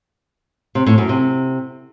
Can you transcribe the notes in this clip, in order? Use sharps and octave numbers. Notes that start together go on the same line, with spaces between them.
C3
A2
F#2
C3